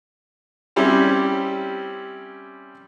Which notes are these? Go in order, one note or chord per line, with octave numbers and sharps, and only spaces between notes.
G3 C4 C#4 E4 G4